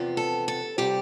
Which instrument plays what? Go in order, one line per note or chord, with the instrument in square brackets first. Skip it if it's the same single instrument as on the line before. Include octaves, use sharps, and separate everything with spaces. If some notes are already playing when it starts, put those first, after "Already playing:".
Already playing: [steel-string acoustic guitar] E2 C3 F3 B3
A4
A4
C3 G3 G4